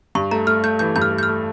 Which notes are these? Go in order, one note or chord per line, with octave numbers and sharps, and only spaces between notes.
G2 C#6
A3 A#5
A3 F6
A3 G6
E3 G6
G2 G6
F6
A3
G6
F6
A3